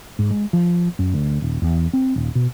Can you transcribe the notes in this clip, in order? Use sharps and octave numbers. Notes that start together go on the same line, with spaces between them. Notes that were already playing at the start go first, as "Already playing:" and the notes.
G#2
G#3
F3
F#2
D2
D#1
E2
C4
D#1
B2